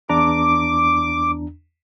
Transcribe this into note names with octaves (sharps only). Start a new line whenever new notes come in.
E2 D4 A#5 D6